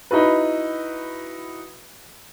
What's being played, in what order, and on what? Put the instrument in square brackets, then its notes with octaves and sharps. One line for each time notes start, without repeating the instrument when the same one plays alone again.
[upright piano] D#4 E4 F#4 B4